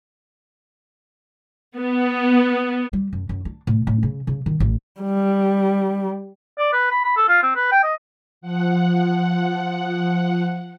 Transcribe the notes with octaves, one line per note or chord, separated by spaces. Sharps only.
B3
G3
F#2
F#2
D4
A2
A2
C#3
C#3
D#3
A1
G3
D5
B4
B5
B5
A4
F4
C4
B4
G5
D#5
F3 F#5